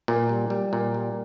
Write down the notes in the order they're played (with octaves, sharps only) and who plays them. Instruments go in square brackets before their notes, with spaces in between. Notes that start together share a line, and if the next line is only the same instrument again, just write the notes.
[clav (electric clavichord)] A#2
G3
G3
A#2
G3